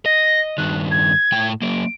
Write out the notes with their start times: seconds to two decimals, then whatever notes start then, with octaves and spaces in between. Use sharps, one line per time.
0.06 D#5 A#6
0.58 G2 D#3 F#6
0.91 G#6
1.32 A2 G5
1.62 F#3 A#3 D7